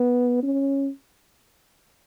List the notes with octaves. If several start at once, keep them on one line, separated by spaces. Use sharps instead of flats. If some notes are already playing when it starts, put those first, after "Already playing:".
Already playing: B3
C#4